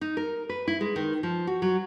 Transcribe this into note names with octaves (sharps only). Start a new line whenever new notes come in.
D#4
A#4
B4
E4
G#3
D#3
F3
F#4
F#3